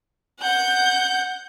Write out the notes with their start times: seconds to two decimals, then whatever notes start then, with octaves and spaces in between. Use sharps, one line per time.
0.40 F#5 G6